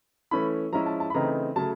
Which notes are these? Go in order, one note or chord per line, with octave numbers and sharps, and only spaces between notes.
E3 A3 C#4 E4 B5
F3 G#3 C#4 E4 A#5
A5
A5
B5
C#3 E3 A3 C4 D#4 A#5
C#3 F#3 A3 A5